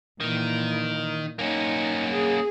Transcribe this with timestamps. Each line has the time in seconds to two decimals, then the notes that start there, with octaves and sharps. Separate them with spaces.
0.20 A#2 D#3 E3
1.39 A#3 C#4 D#4
2.10 G#4